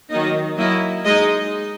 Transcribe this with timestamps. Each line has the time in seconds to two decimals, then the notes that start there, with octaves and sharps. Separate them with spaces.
0.10 D#3 F#3 A#3 D#4 D#5
0.57 F#3 A#3 E4 D#5
1.04 G#3 D#4 D#5